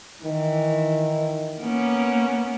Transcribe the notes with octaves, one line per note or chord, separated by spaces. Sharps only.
D#3 E3
A#3 B3 C#4